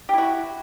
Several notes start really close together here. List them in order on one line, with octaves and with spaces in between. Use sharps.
G4 E4 F#4